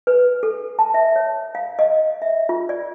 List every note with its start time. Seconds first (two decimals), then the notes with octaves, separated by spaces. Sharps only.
0.07 B4
0.43 A4
0.79 A5
0.94 E5
1.16 C#5
1.55 F5
1.79 D#5
2.22 E5
2.49 F4
2.69 D5